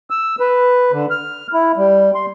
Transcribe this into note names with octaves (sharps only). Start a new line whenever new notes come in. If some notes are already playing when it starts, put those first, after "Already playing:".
E6
B4
D3
F6
E4
G3
C6